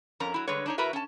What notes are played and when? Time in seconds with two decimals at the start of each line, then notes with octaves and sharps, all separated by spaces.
0.20 F2 C#4 A#4 A#5
0.34 F#3 E4
0.47 D3 G3 G#3 B4 C#5
0.66 D4 D#4 C#5
0.78 E4 F#4 A#4 B4 E5
0.93 C#4 A5